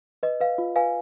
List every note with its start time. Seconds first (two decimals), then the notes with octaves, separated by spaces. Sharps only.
0.23 B4 D#5
0.40 B4 F5
0.58 F4
0.76 B4 F5 G#5